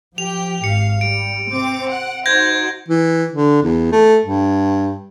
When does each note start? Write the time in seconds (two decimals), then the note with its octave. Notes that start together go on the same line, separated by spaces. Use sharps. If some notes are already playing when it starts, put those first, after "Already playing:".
0.18 F3 G4 G5 F7
0.64 G#1 F5 C#7
1.01 G3 D7
1.50 C3 C4 D6
1.89 F#5
2.26 D#4 F#4 C5 G6 G#6 A#6
2.89 E3
3.33 D3
3.63 E2
3.92 A3
4.25 G2